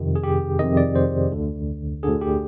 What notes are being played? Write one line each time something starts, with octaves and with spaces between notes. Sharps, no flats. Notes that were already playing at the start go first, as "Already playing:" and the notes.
Already playing: F2 C3 D#3
G#4
G4
F2 C3 D#3 D#5
D5
C5
D2 D3
D2 D3 G#4
G4